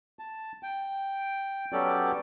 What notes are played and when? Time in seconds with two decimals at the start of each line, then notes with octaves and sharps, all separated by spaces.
0.19 A5
0.63 G5
1.73 F#3 B3 C#4 G4 A4 D5